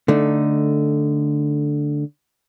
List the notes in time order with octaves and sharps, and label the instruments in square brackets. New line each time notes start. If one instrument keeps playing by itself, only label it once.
[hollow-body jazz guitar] D3 A3 D#4